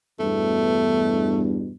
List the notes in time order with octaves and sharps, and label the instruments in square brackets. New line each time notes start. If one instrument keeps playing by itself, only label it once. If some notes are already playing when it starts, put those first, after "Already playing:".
[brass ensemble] E2 G2 B2 [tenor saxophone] A3